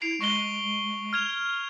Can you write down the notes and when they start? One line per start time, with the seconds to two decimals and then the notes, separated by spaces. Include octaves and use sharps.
0.02 E4 C7 D7 F7
0.21 G#3 C#6 G7
1.13 F6 G#6 F7